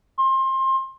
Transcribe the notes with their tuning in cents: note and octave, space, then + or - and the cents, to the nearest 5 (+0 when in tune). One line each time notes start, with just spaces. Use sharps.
C6 +25